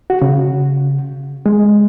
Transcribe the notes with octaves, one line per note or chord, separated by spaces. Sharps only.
F#4
C#3
G#3